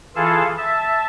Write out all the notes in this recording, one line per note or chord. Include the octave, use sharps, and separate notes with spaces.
E3 F4 G#4 A4 F5 A5
E5 A5